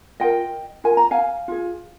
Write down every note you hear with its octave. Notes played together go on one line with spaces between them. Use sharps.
F4 A#4 D#5 G5
F4 A#4 G#5
A#5
F5 G#5
F4 G#4